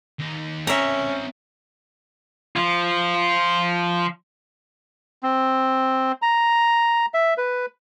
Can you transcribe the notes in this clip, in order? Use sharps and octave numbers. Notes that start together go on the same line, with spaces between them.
D#2 D#4
C4 C#4 A#4 E5 A#5
F3 F4
C4
A#5
E5
B4